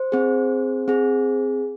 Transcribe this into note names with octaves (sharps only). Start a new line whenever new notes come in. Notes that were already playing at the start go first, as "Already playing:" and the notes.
Already playing: C5
C4 G#4
C4 G#4